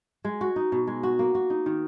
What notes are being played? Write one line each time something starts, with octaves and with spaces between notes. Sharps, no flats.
G#3
F#4
D#4
B2
G#3
F#4
A#3
F#4
D#4
D#3